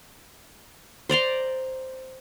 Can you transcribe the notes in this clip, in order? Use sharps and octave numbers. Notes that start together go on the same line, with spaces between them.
C5 D5 A#5 C6